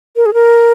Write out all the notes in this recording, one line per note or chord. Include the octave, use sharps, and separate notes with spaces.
A#4
G#4
A#4